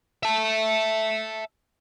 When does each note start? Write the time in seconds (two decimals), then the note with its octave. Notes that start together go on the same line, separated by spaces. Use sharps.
0.23 E5 A5